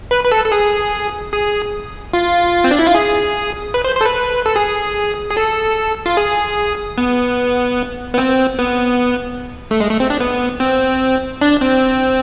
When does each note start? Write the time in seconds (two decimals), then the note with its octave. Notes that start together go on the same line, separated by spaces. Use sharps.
0.11 B4
0.25 B4
0.32 A4
0.45 A4
0.52 G#4
1.33 G#4
2.13 F4
2.64 C4
2.71 D4
2.79 E4
2.87 F4
2.94 G#4
3.74 B4
3.84 C5
3.95 C5
4.01 A4
4.06 B4
4.46 A4
4.56 G#4
5.30 G#4
5.37 A4
6.06 F4
6.17 G#4
6.98 B3
8.14 B3
8.18 C4
8.59 B3
9.71 A3
9.80 G#3
9.90 A3
10.00 C4
10.10 D4
10.20 B3
10.60 C4
11.41 D4
11.61 C4